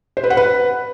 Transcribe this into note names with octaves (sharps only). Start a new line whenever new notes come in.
C5
B4
F#5
B4